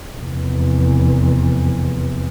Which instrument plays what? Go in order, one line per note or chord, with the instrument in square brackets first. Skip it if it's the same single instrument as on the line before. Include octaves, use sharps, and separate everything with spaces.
[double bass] F1 E2